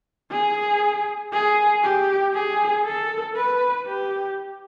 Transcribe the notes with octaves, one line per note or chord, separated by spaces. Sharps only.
G#4
G#4
G4
G#4
A4
B4
G4